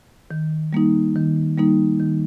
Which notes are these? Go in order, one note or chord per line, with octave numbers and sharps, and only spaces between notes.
D#3
G3 A#3 D#4
D#3
G3 A#3 D#4
D#3